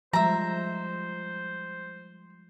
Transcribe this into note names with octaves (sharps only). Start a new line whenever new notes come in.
F3 G3 G#3 C5 E5 A#5